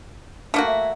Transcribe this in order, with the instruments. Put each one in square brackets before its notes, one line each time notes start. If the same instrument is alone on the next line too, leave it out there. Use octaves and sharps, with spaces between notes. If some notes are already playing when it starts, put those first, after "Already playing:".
[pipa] A3 A#3 F#4 [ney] D4
[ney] E5